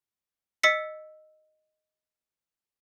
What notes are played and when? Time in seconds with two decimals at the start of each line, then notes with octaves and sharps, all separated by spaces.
0.63 D#5 E6 B6 C#7